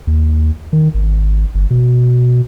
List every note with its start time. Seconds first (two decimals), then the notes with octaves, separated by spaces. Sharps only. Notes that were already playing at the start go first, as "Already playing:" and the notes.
0.07 D#2
0.73 D#3
0.94 G#1
1.55 G1
1.71 B2